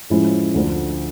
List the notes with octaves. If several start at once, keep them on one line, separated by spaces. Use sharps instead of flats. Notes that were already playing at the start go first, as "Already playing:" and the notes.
A2 F3 G#3 C#4 E4
D2 D3 F3